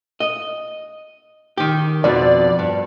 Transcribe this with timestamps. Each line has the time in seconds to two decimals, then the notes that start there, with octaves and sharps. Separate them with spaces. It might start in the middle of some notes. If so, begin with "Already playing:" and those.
0.20 D#5
1.57 D#3 G4
2.04 F2 B2 D5
2.59 G2